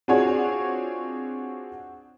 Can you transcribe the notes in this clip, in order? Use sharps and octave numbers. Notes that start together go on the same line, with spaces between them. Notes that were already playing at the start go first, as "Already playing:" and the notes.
C4 D4 F4 F#4 G#4 C#5